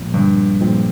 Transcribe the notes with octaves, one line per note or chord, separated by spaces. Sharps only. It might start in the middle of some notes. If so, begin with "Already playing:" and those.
Already playing: A#2 F3 G#3 C4
G2
A#2 F3 G#3 C4